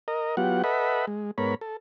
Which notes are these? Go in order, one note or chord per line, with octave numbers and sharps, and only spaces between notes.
A#4 D#5
F#3 B3 F4 G4 F#5
A4 B4 D#5 E5 F#5 B5
G#3
G#2 B3 A#4 C#5 B5
A4